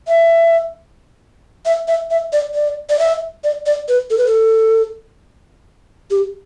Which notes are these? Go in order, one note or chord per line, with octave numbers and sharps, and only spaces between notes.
E5
E5
E5
E5
D5
D5
D5
E5
D5
D5
B4
A4
B4
A4
G4